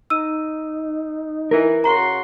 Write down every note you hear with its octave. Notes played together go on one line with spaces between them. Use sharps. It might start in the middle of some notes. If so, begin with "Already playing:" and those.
D#4 E6 D#7
E3 A#4
C#3 F#4 A#5 C6